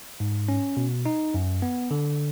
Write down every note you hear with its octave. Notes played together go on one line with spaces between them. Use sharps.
G#2
C#4
B2
D#4
F#2
B3
D3